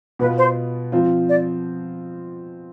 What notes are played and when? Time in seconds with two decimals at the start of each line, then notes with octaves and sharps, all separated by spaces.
0.19 B2 B3 F4 B4
0.37 C5
0.92 F3 C4 F4
1.29 D5